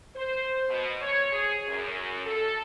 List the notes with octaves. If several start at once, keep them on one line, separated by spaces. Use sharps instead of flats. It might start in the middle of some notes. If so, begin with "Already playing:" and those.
C5
B2
C#5
G#4
F#2
A4